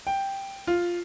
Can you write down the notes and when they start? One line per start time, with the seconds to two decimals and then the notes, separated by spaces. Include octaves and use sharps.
0.07 G5
0.67 F4